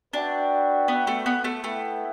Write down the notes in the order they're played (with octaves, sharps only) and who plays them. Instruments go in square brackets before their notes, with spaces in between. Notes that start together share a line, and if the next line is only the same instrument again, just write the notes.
[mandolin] D4 [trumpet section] F#4 B4 E5 G5
[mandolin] B3
A3
B3
A3
[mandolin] A3 [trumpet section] B3 E4 B4 E5 G5